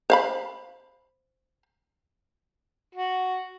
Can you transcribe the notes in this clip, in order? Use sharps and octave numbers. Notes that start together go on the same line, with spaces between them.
C5 F5 B5
F#4